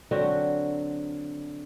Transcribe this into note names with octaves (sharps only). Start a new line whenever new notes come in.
D3 F#3 C4 F#4